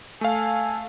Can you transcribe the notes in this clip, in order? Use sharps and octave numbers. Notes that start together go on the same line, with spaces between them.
A3 A4 F5 G#5